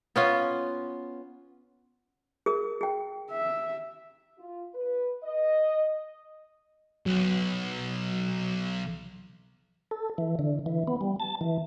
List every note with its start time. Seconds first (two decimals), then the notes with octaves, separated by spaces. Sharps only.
0.16 B3 C#4 F4
2.46 G#4 A#4 D#6
2.81 G#4 G5
3.31 E5
4.39 F4
4.74 B4
5.23 D#5
7.06 B1 F#3
9.91 A4
10.18 E3
10.39 D3
10.66 E3
10.87 B3
11.01 G3
11.20 A5
11.41 E3